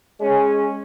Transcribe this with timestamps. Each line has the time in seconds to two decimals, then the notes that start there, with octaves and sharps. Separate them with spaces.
0.20 G#3 C#4